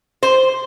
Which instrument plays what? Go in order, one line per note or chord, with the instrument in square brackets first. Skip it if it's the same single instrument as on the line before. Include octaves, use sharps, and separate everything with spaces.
[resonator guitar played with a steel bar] C5